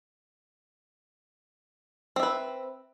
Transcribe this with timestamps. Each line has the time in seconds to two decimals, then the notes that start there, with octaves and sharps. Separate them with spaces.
2.16 C4
2.20 E5
2.23 B4